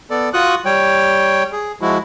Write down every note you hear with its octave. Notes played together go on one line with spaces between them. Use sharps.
B3 A4 D5
F4 F#4 C#6 D#6 F#6
G3 C#5 G5
G#4
F3 G#3 E4 F#4